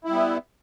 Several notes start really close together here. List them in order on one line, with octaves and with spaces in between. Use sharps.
E4 G3 B3